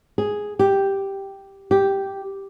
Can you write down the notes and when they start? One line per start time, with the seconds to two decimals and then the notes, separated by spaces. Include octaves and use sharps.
0.18 G#4
0.59 G4
1.71 G4